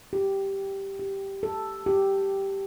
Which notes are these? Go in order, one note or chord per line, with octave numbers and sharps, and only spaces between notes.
G4
G4
A4
G4